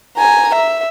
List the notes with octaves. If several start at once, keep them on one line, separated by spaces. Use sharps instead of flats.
G#5 A#5
E5